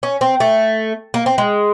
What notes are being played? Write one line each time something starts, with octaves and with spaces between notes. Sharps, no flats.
C#4
C4
A3
A#3
C4
G#3